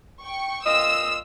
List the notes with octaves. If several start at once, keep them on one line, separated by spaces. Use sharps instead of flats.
G5 C#6
A#2 F4 D#5 E6